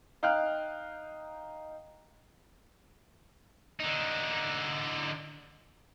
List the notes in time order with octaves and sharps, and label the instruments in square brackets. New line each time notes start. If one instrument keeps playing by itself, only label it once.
[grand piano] D#4 F5 G5 F6 F#6
[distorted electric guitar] D3 D#4